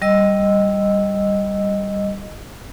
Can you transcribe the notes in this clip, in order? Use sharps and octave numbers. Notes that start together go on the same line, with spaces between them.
G3 D#5 E6